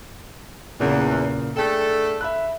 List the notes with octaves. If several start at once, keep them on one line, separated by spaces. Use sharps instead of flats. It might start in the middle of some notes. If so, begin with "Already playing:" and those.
E2 A#2 C#3 A#3
A3 D4 G#4 A4 G5
E5 B5 F#6